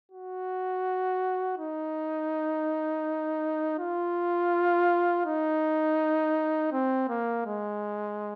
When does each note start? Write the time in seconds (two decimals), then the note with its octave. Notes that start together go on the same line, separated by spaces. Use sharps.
0.11 F#4
1.57 D#4
3.78 F4
5.25 D#4
6.72 C4
7.08 A#3
7.46 G#3